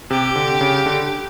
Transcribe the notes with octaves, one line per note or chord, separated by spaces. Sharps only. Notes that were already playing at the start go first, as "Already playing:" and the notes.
C3 G4
D3
C#3
D3